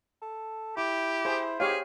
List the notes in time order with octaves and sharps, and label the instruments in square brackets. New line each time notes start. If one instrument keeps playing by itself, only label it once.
[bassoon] A4
[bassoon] E4 [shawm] G4 [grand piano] D6
[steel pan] G#4 [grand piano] C5
[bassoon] G#2 [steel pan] G4 C#5 F5 [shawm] G#4